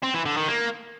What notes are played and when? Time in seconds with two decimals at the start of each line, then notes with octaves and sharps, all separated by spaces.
0.03 C4
0.14 E3
0.25 D3
0.37 D#3
0.48 A#3